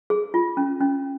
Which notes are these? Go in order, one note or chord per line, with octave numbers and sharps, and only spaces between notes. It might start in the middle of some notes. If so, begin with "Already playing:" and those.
G#4
F4
C#4
C#4